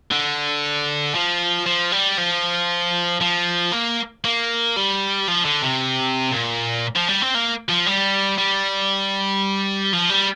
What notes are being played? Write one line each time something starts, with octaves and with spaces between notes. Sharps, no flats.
D3
F3
F3
G3
F3
F3
A#3
A#3
G3
F3
D3
C3
A#2
F3
G3
C4
A#3
F3
G3
G3
F3
G3